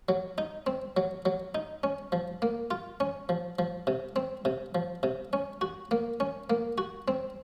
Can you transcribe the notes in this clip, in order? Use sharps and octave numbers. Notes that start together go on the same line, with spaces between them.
F#3
D#4
C4
F#3
F#3
D#4
C#4
F3
A#3
F4
C#4
F3
F3
C3
C4
C3
F3
C3
C#4
F#4
A#3
C#4
A#3
F#4
C4